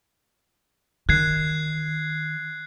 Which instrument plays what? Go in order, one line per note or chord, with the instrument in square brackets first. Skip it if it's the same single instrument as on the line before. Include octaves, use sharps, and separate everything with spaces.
[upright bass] D#3 [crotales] F#6 G#6 C7